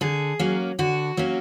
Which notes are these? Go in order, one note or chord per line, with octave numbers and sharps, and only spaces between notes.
D3 G#4
F#3 A#3 C#4
D3 F#4
F#3 A#3 C#4